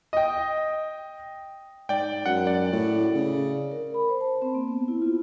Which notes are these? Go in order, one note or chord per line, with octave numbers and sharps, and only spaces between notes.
D#5 G5
G#2 D5 G5
F#2 F#5
D5
A2
C#3
A#4
B5
C5
A5
C4
A#3
B3
E4
F4